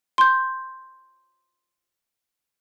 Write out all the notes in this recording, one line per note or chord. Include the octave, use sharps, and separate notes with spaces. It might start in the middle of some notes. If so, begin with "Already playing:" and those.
C6 G6